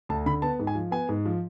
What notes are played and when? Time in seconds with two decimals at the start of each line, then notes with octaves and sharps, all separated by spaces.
0.09 D2 A5
0.26 D3 B5
0.42 B3 A5
0.59 G#2
0.67 G#5
0.75 F3
0.91 B3 G#5
1.09 G#2
1.25 F3